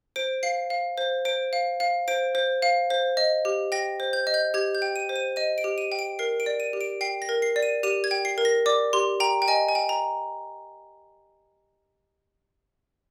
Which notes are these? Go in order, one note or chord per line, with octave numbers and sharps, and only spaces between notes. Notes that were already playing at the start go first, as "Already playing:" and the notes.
C5 D7
F5 C7
F5
C5
C5 D7
F5
F5
C5 D7
C5
F5
C5
D#5
G4
G5 A#6
C5
G6
D#5
G6
G4 G#6
G6
G5
D#7
C5
D#7
D#5 D#7
D7
G4
D#7
G5
D7
A#4 C7
D7
D5
D#7
G4
D7
G5 C7
A#6
A#4
C7
D5
D#7
G4 D#7
G#6
G5
C7
A#4
A#6
D5 D6
G4 C6
G5 A#5
G5
D#5 G#5
G#5
G5
A#5